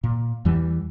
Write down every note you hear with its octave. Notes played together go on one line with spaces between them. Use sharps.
A#2
E2 E3 G3